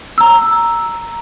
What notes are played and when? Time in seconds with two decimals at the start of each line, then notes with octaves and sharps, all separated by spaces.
0.18 A#5 E6